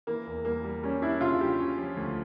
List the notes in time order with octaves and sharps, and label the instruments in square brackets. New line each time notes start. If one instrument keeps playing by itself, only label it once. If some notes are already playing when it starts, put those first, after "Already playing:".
[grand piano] E3 [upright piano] A#3
[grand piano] E2
[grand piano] G3 [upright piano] A#3
[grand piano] G3
[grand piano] G3 [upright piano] C#4
[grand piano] D4 [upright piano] E4
[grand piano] C#3 [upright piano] F4
[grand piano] G3 [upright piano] G4
[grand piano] C#4
F3
D2